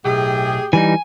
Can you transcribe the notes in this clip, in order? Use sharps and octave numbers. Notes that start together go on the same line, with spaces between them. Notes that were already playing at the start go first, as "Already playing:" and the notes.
B1 A2 G4 G#4
E3 G3 D#4 G#5